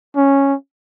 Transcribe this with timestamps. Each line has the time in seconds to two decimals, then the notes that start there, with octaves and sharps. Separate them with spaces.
0.16 C#4